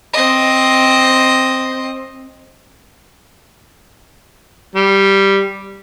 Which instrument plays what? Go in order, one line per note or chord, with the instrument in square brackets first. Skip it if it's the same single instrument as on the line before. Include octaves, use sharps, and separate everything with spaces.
[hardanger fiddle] C4 D#5
[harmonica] G3